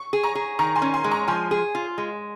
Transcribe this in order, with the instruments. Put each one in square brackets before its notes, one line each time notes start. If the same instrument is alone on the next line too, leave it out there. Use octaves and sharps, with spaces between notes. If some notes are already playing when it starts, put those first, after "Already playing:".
Already playing: [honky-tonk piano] C#6
[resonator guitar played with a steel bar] G#4
[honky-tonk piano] A#5 C#6
[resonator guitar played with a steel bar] G#4
[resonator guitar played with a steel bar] D#3 [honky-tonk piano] A#5 C#6
[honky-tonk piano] G#5 C6
[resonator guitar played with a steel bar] C#4
[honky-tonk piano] G#5 C6
[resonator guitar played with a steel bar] G#3
[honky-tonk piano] A#5 C#6
[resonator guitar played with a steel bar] F3 [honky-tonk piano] G#5 C6
[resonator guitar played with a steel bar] G#4
F4
G#3